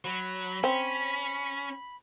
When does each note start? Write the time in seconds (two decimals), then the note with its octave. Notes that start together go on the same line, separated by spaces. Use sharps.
0.05 F#3 B5
0.64 C4 C#4